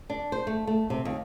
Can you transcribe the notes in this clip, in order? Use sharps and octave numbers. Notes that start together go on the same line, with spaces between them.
D4
C5
A3
A3
C3
D#2